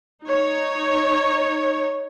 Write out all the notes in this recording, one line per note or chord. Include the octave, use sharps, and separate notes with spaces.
D#4 C#5